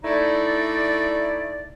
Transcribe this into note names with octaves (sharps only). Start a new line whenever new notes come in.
A3 D#4 E4 D5